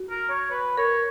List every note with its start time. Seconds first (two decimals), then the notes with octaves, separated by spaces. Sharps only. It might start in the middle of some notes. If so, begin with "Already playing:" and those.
Already playing: F#4
0.10 A#4
0.30 C#5
0.50 B4
0.77 A#4 C#5